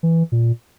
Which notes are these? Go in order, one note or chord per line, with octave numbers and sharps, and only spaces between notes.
E3
A#2